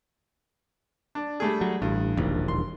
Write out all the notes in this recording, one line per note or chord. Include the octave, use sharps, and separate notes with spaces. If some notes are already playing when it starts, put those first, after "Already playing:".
D4
G3 A3 G#4
F#3
A1 G2
E1 A#1 D#2
C6